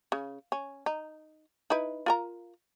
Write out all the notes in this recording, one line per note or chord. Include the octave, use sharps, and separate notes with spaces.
C#3
C#4
D#4
D#4 E4 B4
F4 A#4 A#5